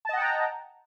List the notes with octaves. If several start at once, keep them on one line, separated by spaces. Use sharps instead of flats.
D#5 F#5 G5 A5 A#5